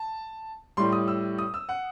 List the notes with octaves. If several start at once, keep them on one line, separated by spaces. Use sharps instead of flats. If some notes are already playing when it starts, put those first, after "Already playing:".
Already playing: A5
A2 G3 C6
D#6
E6
D#6
E6
F#5